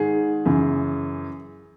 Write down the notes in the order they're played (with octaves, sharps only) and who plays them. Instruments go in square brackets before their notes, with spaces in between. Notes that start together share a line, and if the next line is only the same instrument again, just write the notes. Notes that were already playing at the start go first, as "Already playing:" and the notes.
Already playing: [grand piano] G#2 D#3 G#4
F#2 C#3 E3